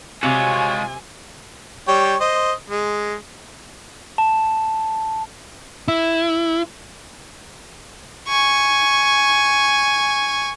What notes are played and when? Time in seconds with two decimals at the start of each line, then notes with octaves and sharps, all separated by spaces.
0.23 C3 G#3 F4 F#4 C#5 G#5
1.88 G3 C#5 G5
2.20 C5 D#5
2.70 G#3
4.18 A5
5.88 E4
8.28 G#5 C#6